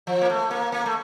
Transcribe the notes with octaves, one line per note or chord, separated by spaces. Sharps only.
F3
A#3
A3
A#3
A#3
A3